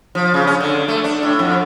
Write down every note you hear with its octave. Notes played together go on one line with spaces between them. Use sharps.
F3
C#3
C#4
D3
A3
D4
A2
F2